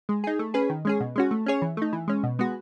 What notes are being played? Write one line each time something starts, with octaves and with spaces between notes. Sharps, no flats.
G#3
D#4 G#4
A3
C#4 G#4 B4
D#3
G#3 C#4 G#4
B2
G#3 C#4 F#4
A3
C#4 G#4 C#5
E3
A3 D#4
E3
G#3 C#4
B2
G#3 B3 F#4